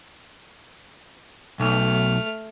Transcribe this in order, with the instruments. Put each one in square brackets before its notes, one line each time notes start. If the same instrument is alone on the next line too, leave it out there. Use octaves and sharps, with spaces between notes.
[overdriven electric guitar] B1 [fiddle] A3 F6